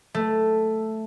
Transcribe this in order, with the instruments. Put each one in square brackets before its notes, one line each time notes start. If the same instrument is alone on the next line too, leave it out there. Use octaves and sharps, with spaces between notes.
[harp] A3